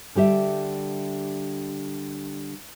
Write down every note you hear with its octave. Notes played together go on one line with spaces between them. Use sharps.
D3 G3 G4 E5